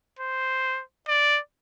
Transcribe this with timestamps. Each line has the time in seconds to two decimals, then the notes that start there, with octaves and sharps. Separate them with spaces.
0.19 C5
1.08 D5